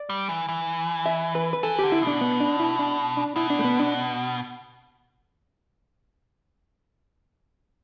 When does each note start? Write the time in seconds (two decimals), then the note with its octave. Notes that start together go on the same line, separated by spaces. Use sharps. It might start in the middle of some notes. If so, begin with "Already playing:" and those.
Already playing: D5
0.10 G3
0.29 E3
0.48 E3
1.06 E5
1.35 B4
1.53 B4
1.63 E3 A4
1.79 D3 G4
1.92 E4
2.02 B2
2.07 D4
2.21 B3
2.40 D4
2.60 E4
2.79 D4
3.17 D4
3.36 B2 E4
3.50 D4
3.59 A3
3.64 B3
3.79 D4